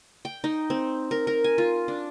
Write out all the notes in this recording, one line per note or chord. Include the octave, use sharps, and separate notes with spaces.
G5
D#4
C4
A#4
A#4
G#5
F4
D4